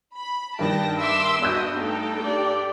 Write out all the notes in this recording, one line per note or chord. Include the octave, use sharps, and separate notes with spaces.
B5
G2 D#3 G3 G5 A5 A#6
E5 C6 D6 E6 D7
G2 B3 F#4 D#5 E6 G6
A3 D#4 A4 G5
G4 D5